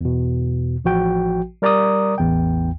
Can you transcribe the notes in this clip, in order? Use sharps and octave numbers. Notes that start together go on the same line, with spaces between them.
E2 B2
A1 F3 F#4 G5
G3 A#4 D5 A#5 D6 D#6
A1 E2 G5